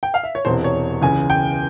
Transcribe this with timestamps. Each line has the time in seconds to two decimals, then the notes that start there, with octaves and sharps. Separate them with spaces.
0.03 G5
0.14 F5
0.23 E5
0.35 C#5
0.45 E1 E2 C3 E3 C5
0.64 C#5
1.02 C#2 C#3 E3 G#5
1.30 G5